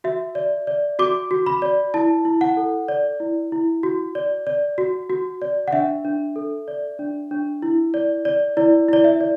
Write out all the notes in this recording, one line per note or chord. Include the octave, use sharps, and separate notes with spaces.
F#4 E5
D5
D5
F#4 D6
F#4
B5
D5
E4 A5
E4
F#5
A4
D5
E4
E4
F#4
D5
D5
F#4
F#4
D5
F#5
D4 E5
D4
A4
D5
D4
D4
E4
D5
D5
E4 D5
E4 D5
E5
D5